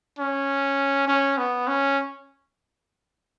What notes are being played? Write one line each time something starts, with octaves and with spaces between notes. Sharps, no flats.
C#4
C#4
B3
C#4